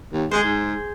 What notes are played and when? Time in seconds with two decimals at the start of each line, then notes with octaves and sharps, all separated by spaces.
0.12 D#2
0.31 G#3 G#4 C5
0.44 G#2